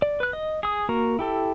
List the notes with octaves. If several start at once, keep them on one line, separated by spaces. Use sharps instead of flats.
D5
B4 F#6
D#5
G#4 D#6
A#3 F#4 A#4
E4 G4 A4